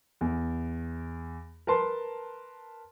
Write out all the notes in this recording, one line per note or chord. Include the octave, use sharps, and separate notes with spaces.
E2
A#4 B4 A5 C6